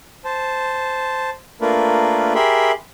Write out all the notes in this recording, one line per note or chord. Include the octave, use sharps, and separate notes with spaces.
C5 A5
A3 A#3 D4 F4 A#4 B4
G4 G#4 A#4 E5 B5 C6